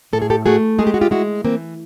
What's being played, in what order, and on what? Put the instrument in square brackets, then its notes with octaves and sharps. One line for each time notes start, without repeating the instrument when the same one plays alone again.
[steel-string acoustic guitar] A2 A4
G#4
G4 A4
A3 F#4 G#4
G#3 G#4
G4
F#4
F4 G4
G#3 E4 F#4
E3 A#3 C4